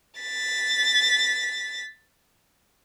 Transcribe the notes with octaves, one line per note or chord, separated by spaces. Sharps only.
A6 B6